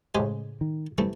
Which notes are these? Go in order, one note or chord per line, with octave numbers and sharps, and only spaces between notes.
A2 C#3 G#3 G4 C5 G#5
D#3
C3 E3 G3 A3